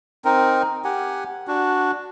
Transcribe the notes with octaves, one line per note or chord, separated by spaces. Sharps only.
C4 D#4 A#4
G4 F#5 G#5
D4 F#4